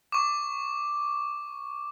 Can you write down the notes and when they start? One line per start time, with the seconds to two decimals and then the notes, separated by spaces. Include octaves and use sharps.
0.12 C#6 D6